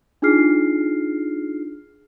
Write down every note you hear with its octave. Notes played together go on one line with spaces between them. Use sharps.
D4 D#4 F4 G#4 F6 C7